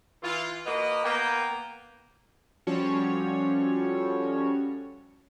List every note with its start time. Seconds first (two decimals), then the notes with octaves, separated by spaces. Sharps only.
0.23 E3 F4
0.65 A#3 F#4 B4 D#5
1.04 A#3 B3 G5
2.67 F3 G3 C#4 F#4 A4 C#5